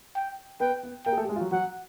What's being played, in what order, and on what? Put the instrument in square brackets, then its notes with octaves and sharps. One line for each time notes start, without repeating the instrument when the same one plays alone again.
[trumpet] G5
[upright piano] B3 B4 [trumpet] G5
[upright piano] B3 B4
[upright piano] A#3 A#4 [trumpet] G5
[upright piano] G#4
A3 A4
G4
G#3 G#4
F4
F#3 F#4
[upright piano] F#3 F#4 [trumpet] F#5